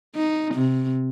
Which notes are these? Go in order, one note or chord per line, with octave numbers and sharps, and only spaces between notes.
D#4
C3